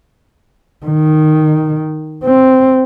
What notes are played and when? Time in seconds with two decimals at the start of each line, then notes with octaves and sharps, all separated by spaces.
0.86 D#3
2.24 C4